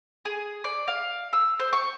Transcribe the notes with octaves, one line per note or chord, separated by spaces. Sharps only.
G#4
D5
F5
E6
C5
C#6